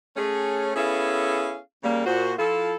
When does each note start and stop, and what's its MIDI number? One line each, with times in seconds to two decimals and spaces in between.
0.17 0.71 57
0.17 0.71 61
0.17 0.71 68
0.76 1.58 59
0.76 1.58 61
0.76 1.58 64
0.76 1.58 68
0.76 1.58 69
0.76 1.58 77
1.83 2.06 49
1.83 2.06 55
1.83 2.06 58
2.06 2.33 46
2.06 2.33 66
2.06 2.33 72
2.38 2.75 53
2.38 2.75 64
2.38 2.75 65
2.38 2.75 69